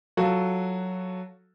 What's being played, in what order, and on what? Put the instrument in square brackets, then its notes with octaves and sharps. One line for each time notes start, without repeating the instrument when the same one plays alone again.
[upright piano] F#3 F4 F#4 A4